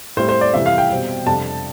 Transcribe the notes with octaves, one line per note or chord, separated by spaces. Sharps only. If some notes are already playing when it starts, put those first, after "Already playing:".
A2 G3 C4 E4 C5
C5
D5
F2 C3 E3 G3 E5
F5
G5
B2 G3 C4
F2 C3 G3 D4 A5